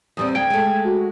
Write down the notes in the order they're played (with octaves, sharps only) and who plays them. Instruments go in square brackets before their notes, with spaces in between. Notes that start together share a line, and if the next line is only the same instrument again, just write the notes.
[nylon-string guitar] E2 G3 C4 [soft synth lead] D#6
[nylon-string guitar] D2 [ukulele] G5 [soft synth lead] G#6
[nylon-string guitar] G#3 A3
[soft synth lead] F#4